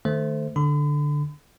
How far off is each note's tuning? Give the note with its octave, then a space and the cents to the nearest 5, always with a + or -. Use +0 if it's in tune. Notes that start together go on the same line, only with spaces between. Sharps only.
D#3 -25 A3 +5 C5 -10
D3 +0 B5 +40